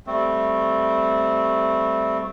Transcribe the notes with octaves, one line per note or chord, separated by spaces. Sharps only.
G3 A3 C4